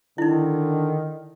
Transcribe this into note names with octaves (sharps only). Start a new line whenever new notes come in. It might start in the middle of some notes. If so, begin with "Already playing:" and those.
D3 D#3 D#4 E4